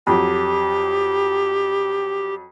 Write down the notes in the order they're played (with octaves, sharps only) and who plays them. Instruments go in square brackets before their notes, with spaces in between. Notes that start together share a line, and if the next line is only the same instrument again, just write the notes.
[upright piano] F2 F#3 [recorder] G4